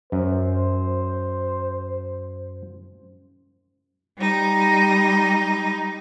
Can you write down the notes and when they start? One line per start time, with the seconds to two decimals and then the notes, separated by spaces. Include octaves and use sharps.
0.12 F#2 C5
4.17 G3 D#4